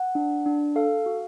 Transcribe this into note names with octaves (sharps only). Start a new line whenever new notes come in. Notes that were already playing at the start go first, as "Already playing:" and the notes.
Already playing: F#5
D4
D4
A4 F5
F#4